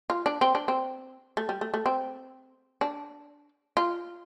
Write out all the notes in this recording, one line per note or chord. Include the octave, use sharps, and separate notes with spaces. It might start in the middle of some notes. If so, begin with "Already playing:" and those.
F4
D4
C4
D4
C4
A3
G3
A3
A3
C4
D4
F4